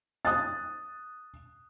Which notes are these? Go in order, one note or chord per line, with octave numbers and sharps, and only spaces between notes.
D#6 F#6 A6